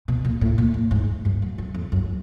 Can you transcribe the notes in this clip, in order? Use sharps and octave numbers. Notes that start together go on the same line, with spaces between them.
B2
A#2
A2
A#2
A2
G#2
G2
F#2
F#2
F2
F#2